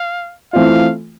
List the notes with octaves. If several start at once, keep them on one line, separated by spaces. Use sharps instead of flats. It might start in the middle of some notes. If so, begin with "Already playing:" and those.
Already playing: F5
E3 A3 C4 F4 F5